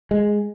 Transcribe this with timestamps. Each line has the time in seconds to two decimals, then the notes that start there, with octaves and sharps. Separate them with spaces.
0.11 G#3